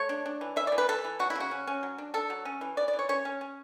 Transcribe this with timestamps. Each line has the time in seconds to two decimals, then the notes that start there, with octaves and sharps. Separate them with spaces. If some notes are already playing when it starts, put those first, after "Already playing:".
Already playing: A3 C#5
0.09 D4
0.26 D4
0.41 E3
0.56 E3 E5
0.67 E3 D5
0.78 B4
0.89 E3 A4
1.05 E3
1.19 F#3 F#4
1.30 E4
1.35 C#3 F#4
1.51 C#4
1.67 C#4
1.83 F#3
1.98 D4
2.14 D4 A4
2.30 F#3
2.45 C#4
2.61 E3
2.77 E3 D5
2.88 D5
2.93 E3
2.99 C#5
3.09 C#4 C#5
3.25 C#4
3.41 C#4